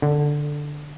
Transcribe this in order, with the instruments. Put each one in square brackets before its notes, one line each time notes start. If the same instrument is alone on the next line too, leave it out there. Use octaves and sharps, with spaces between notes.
[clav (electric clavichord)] D3